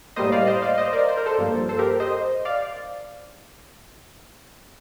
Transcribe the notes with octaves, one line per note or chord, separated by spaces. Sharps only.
A2 G3 A#3 C5 D#5
D5 F5
C5 D#5
D5 F5
C5 D#5
A#4 D5
C5
A#4
A4 C5
G2 F3 A#3
A4 C5
G4 A#4
C5 D#5
D5 F5